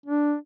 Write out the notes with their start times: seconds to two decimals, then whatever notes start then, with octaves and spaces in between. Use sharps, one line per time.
0.06 D4